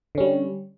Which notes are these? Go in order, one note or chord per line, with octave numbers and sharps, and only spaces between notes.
D3 G3 C#4